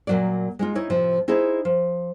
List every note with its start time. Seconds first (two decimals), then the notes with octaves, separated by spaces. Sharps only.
0.07 A#2 E3 F#3 A#3 D5
0.59 G#3 D#4 F4
0.75 D#4 E4 C#5 D#5
0.90 A2 C3 F3
1.28 D#4 E4 G#4 C5 D#5 E5
1.65 F3